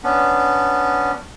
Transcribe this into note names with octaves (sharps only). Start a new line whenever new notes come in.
B3 C#4 D4